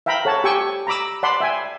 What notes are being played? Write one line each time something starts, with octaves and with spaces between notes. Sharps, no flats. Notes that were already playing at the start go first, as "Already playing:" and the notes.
E5 F5 G5 A#5 B5
A4 C#5 F#5 A5
G4 G5 G#5 C#6 E6
A#5 B5 D6 E6
D5 F#5 A5 B5 C6
E5 G5 G#5